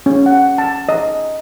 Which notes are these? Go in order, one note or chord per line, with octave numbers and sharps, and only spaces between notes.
C#4
F#5
A5
D#5